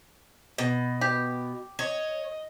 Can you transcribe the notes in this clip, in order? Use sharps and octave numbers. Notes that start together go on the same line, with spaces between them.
B2
G4
C#5 D#5